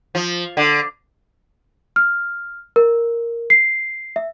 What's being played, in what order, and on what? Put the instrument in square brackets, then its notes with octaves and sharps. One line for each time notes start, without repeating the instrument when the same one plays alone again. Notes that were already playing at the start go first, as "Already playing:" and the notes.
[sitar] F3
D3
[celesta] F6
A#4
C7
E5